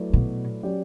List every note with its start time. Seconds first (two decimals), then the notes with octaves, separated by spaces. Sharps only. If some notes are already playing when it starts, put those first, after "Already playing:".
Already playing: F#3 A3 E4 B4 D5
0.13 B2
0.63 F#3 C#4 G4 D5